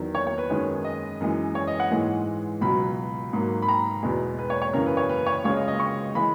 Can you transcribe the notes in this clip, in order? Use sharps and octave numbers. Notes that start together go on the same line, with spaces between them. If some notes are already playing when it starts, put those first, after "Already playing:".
Already playing: E2 D#3 F#3
C#5
C#5
B4
F#2 D#3 G#3
D#5
F#2 E3 G#3
C#5
D#5
F#5
G#2 E3 G#3
C#2 B2 F#3 B5
G#2 F#3 A#3
B5
A#5
E2 B2 G#3
B4
C#5
C#5
F#2 C#3 E3 A#4
B4
C#5
B4
C#5
C#2 C#3 G#3 C#5
D#5
D#5
C#6
E3 G#3 B5